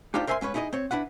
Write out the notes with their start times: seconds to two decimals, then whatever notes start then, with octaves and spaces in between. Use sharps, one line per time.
0.14 D4 D#4 F4 G4 C5 D5
0.27 A#4 C5 E5 G#5 B5 C6
0.41 G#2 C#4 B4 C#5
0.54 D#4 E4 G#4 C#5 D#5
0.73 C4 C#5
0.91 D4 E4 B4 F#5